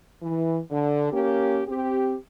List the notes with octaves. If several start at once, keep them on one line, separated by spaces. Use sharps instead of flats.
E3
D3
A#3 C#4 G4
C4 G4